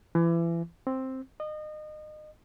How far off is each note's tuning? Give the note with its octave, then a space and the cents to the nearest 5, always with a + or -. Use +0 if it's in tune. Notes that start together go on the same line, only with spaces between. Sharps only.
E3 +30
C4 +5
D#5 -30